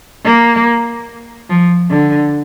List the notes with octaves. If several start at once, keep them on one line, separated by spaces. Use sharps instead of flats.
A#3
F3
D3